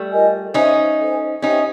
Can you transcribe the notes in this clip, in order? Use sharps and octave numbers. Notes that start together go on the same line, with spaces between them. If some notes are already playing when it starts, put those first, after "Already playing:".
Already playing: G3 A3
F4 A#4 D#5 G#5
C#4 D#4 A4 C5 E5 G#5
A4 C5 E5 G#5
C#4 D#4 G4 C5 E5 G5